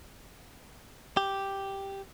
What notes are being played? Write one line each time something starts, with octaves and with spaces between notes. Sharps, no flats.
G4